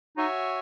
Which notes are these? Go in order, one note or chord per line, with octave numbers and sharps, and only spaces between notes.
D#4 F#4 C#5 E5 G#5